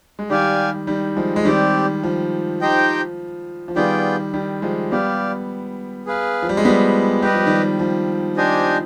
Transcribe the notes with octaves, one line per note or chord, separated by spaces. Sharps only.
G#3
D#3 G3 G4 D5 F5 G#5
D#3 G3
F3 G#3
G#3
D#3 G3 C4 G4 D5
F3
D#4 G4 C5 D#5 G5
F3
D#3 G3 B3 F4 G#4 D5 G5
D#3 G3
F3 G#3
G3 B3 G4 D5 F5
G#4 B4 F5
F3
G3
G#3
G3 B3
G3 G4 B4 D#5
F3
D#3 G3
F3
D4 G4 C5 D#5 G#5